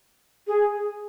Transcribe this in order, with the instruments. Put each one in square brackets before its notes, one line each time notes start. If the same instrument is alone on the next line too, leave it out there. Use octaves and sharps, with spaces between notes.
[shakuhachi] G#4